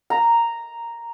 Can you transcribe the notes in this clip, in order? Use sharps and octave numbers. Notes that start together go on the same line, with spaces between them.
A#5